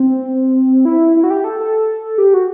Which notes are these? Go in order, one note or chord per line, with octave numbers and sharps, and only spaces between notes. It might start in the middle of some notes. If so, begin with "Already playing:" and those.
Already playing: C4
E4
E4
F#4
G4
A4
A4
G4
F#4